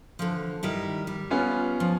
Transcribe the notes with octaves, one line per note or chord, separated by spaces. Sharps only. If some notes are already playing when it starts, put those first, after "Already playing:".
D3 E3 F3
D#3 G3 E4
G3
B3 C#4 F4
F3